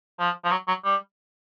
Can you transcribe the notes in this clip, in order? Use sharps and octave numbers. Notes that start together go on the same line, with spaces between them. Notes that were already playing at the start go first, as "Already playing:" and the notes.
F3
F3
F#3
F#3
G3